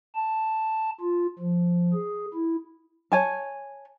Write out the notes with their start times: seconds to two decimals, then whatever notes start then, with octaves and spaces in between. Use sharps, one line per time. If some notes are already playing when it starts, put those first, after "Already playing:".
0.15 A5
1.01 F4
1.39 F3
1.94 G#4
2.34 E4
3.12 C#5 G#5 A5